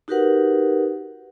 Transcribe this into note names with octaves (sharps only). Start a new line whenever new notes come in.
D#4 F#4 G4 A#4 B4 F#5